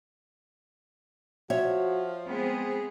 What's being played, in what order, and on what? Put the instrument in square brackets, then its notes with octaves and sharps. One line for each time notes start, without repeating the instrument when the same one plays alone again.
[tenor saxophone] F3 [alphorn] F#4 [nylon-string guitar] C#5 E5
[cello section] G#3 B3 G#4 [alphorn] C4